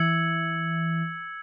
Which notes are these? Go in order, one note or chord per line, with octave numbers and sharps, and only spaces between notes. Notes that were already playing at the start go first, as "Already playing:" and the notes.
Already playing: E3 E6 G#6 C#7 F#7